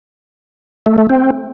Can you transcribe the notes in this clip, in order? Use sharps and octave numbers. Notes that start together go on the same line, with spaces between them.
A3
A3
C4